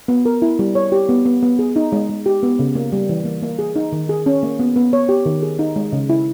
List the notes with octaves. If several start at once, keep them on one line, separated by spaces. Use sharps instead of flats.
B3
A#4
E4
G3
C#5
G4
B3
B3
B3
G#4
D#4
G#3
G#3
G4
B3
C#3
A#3
G3
E3
A#3
A#3
G#4
D#4
D#3
G#4
C#4
A#3
B3
B3
C#5
G4
D#3
G#4
D#4
G#3
C#3
E4